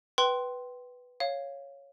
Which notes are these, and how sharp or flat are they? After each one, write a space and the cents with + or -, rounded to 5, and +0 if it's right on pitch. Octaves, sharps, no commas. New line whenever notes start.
B4 +0 G5 -25 C6 +0
C#5 +0 F5 +0